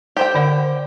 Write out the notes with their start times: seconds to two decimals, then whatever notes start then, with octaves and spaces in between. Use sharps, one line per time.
0.17 G4 C5 G5
0.35 D3 D5 F#5